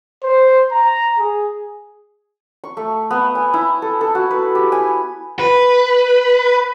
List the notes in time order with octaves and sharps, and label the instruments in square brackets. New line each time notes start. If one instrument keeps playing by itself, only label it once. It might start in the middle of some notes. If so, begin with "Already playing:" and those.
[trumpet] C5
A#5
G#4
[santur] C#6
A3
B3
G#5
E4
A4
A4
F#4
B4
G4
G#5
[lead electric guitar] B4